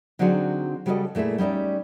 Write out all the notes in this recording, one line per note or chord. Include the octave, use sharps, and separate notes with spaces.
D3 F#3 C4 D#4 F#4 G#4
C#3 G3 F#4 G#4 A4 D#5
A#2 A3 E4 G#4 E5
G3 C#4 D#4 D5 E5